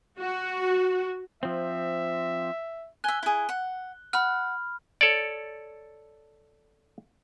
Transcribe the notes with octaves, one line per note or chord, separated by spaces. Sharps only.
F#4
F3 C4 E5
E5 G#5 F#6 G7
E4 G#4
F#5
F#5 B5 F6
A4 C#5 D5